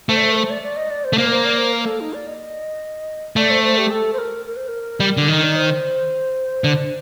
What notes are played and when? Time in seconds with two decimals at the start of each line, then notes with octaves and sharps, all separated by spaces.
0.09 A3 C5
0.17 D5
0.23 C5
0.32 A#4
0.36 C5
0.50 D5
0.63 D5
0.77 D#5
0.90 D5
1.04 C5
1.13 A3
1.17 A#3 C5
1.26 A#4
1.31 C5
1.45 D5
1.58 C5
1.73 A#4
1.86 A4
2.00 D#4
2.13 D5
2.27 D#5
3.36 A3 D5
3.50 C5
3.64 C5
3.78 G4
3.90 A4
4.13 C5
4.18 A#4
4.46 A#4
4.56 C5
4.68 A#4
5.00 G3
5.17 D3
5.28 D#3
5.43 D5
5.55 C5
6.64 D3